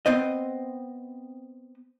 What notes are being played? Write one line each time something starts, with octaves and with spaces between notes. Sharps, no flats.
B3 C4 C5 D#5